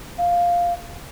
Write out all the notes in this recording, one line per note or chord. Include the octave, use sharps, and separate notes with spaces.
F5